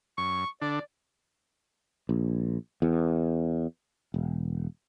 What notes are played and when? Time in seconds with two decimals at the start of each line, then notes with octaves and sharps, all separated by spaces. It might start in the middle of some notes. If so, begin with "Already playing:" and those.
0.18 F#2 C#6
0.62 D3 D4 D5
2.09 A#1
2.82 E2
4.14 E1